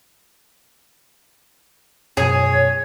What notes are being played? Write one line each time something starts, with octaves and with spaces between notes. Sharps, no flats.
F#2 B2 F3 G#4 C#5